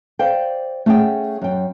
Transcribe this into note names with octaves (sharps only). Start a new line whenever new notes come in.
C5 D5 F5 G5
A3 C#4 G#4 F#5 G5
F#2 G5